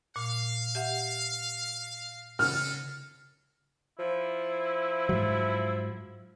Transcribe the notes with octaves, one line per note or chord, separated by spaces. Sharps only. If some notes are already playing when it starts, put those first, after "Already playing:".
A#2 F5
G4 E5 F#5
C#3 G#3 A4 F6
F3 E4
G#2 F#3